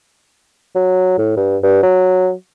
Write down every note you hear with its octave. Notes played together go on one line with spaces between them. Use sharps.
F#3
A2
G2
G2
F#3